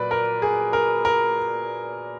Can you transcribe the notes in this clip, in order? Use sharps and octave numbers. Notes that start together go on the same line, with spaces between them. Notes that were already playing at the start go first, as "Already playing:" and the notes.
Already playing: A#2 F#3 B4 D5
A#4
G#4
A#4
A#4